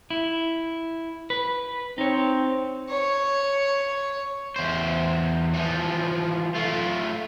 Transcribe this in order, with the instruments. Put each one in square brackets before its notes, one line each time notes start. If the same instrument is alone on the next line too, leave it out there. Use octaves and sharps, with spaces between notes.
[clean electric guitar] E4
B4
[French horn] C4 [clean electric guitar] D#4 C#5
[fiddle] C#5
[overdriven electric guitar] E2 C5
E3 F3
A3 F4